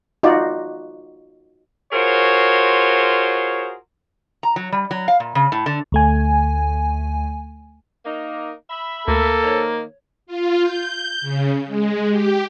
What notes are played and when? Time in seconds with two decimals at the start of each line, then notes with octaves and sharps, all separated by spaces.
0.23 D#4 F4 F#4 D5
1.92 F4 F#4 G#4 A#4 C5 C#5
4.43 A#5
4.56 F#3
4.72 G3
4.91 F#3
5.08 F5
5.20 A#2
5.35 C#3
5.52 A2
5.66 D3
5.92 D2 A3 G#5
8.05 A#3 D#4
8.70 E5 B5
9.08 D2 A#3 A4
9.44 D#3 C5 C#5
10.26 F4
10.62 G6
11.21 C#3
11.66 G#3
12.09 G4